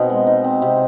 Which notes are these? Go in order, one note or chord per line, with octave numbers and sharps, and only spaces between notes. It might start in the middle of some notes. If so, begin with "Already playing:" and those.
Already playing: B2 C4 D#4
G#3
D#4
C4
C3